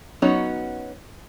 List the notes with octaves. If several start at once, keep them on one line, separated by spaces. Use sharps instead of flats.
F#3 B3 C#4 D#4 F#4